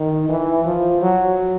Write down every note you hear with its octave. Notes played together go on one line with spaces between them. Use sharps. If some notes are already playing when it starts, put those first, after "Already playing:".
Already playing: D#3
E3
F3
F#3